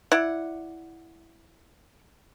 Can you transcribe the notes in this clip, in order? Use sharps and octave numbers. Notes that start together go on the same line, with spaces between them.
E4 D5 F#5